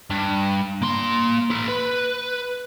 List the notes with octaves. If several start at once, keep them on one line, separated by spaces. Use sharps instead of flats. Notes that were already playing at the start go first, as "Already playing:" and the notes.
G2
A#3 C6
A4 B4
B4